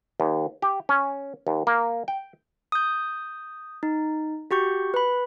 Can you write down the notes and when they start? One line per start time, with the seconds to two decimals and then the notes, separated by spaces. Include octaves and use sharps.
0.20 D#2
0.62 G4
0.89 C#4
1.47 D#2
1.67 A#3
2.08 G5
2.72 D#6 G6
3.83 D#4
4.51 F#4 G4 C#6 G6
4.94 B4 B5